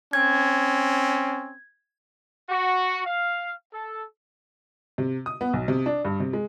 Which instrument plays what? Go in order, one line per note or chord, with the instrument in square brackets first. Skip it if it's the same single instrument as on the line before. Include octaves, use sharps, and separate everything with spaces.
[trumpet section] C4 C#4 [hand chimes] G#6
[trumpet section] F#4
F5
A4
[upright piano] C3
D#6
B3
B1
C3
D4
G2
C3
G#3